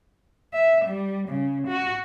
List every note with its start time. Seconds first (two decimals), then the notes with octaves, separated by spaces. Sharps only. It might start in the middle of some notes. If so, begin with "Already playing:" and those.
0.54 E5
0.85 G3
1.29 C#3
1.68 F#4